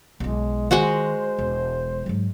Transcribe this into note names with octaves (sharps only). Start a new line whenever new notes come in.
B1 G#3 E4
D#3 G#3 F#4 C5 F#5
E1
G#2 F#3